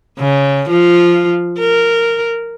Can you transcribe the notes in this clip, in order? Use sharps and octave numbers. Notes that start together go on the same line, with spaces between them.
C#3
F3 F4
A#4